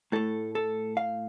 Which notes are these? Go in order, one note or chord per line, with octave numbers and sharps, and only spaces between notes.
A2 A3 A4
A4
F5